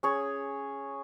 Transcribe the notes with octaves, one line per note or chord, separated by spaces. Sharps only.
C#4 G#4 C#5